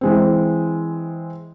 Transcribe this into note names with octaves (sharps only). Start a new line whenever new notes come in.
E3 G#3 C4